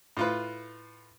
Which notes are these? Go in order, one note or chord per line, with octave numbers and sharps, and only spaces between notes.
A2 F4 B4